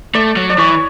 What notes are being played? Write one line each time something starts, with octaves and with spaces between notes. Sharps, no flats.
A3 D5
F#3
D5
E3 C#5